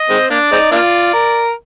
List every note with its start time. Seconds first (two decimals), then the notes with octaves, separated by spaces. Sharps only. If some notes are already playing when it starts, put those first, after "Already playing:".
Already playing: D#5
0.09 D#3 G#3 C4
0.30 A#3 D4 D5
0.52 G#3 C4 D#4
0.72 A#3 D4 F4 D5
1.14 A#4